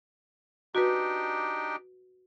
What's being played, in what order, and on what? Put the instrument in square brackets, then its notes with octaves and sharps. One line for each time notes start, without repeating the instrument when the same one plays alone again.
[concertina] D4 D#4 G4 [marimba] F#4 B4